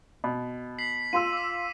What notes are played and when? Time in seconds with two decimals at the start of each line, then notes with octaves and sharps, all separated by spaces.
0.24 B2
0.79 B6 C7 F#7
1.13 F4 C6 E6 D#7
1.33 D6 B6